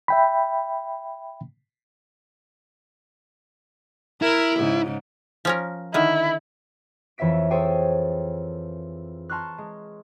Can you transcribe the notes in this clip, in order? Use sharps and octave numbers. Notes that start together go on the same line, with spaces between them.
E5 G5 B5
E4 A#4
G#2 C#3
F3 C#4 A#4
D3 D#3 E4
F2 E3 C#5 E5 B6 D7
G#4 A4 C5 C#5 G5 G#5
A5 A#5 C6 C#6 F6 F#6
G#3